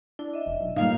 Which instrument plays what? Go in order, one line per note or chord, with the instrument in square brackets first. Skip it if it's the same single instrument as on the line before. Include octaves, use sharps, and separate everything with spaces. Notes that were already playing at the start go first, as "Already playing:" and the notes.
[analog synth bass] D4 [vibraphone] E4
[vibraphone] D#5 E5
[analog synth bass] F1
B1
[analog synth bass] A2 [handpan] G3 A#3 D#4 [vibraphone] F4 D#6 [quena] F5